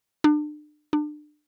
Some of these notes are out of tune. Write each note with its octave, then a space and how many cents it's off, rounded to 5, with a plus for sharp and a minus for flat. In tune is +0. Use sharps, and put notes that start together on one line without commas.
D4 +35
D4 +30